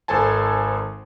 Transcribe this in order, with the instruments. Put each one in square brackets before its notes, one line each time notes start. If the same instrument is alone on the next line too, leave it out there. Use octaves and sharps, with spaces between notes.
[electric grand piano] G#1 A4 C5 G#5 A5